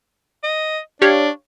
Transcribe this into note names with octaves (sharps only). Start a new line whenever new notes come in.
D#5
D4 G4 C#5 F5